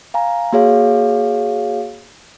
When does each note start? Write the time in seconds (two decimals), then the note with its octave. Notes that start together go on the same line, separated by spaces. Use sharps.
0.14 F5 G#5 A#5
0.52 A#3 F#4 G#4 C#5 F5